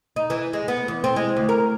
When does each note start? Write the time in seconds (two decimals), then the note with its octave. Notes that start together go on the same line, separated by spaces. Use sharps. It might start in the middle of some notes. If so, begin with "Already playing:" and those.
0.16 D#4
0.30 E3
0.53 G#3
0.68 B3
0.88 E2
1.04 C4
1.16 G#3
1.36 D2
1.49 A#4